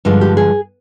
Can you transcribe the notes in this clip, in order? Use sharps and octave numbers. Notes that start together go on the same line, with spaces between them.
G2 D3 F3 G#3
G4
G#4